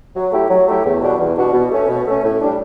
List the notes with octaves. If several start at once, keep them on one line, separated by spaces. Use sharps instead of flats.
F#3
A3 E4 G4
F#3
A3 E4 G4
E2
B2 G3 D4 F#4
E2
B2 G3 D4 F#4
B2
A3 C#4
B2
A3 C#4
A2
G3 D4